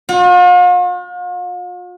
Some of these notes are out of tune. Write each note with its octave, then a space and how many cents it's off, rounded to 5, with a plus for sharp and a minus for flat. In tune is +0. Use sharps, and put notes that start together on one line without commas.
F4 +45